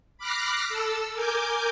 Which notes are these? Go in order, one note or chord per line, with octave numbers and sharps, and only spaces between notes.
B5 D6 F6 F#6 A#6 C7
A4 E6
A#4 G#5 D6 G6